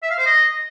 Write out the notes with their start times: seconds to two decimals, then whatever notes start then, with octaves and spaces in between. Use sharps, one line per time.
0.03 E5
0.10 F5
0.18 C5
0.26 D#5